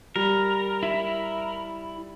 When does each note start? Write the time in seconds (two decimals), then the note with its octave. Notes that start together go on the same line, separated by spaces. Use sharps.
0.16 G3 A#4
0.83 E4